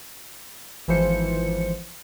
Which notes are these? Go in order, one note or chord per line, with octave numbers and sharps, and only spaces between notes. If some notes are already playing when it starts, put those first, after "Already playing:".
G#1 E3 F3 C5 C#7